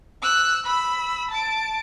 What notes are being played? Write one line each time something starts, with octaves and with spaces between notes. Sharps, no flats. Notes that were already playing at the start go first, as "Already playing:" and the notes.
E6 F#6
B5 E6
A5 D7